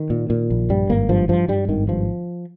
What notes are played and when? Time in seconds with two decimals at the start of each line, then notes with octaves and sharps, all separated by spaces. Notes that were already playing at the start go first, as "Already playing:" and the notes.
Already playing: D#3
0.10 A#2
0.30 A#2
0.50 A#1
0.70 G2 G3
0.90 G#1 A#3
1.09 G2 F3
1.29 G2 F3
1.48 G2 G3
1.68 G#1 D#3
1.88 G2 F3